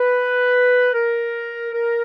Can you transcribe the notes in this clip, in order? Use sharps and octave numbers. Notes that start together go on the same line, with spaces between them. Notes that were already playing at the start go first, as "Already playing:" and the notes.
Already playing: B4
A#4
A#4